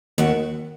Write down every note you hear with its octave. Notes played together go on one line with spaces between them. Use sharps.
D#2 F#4 F#5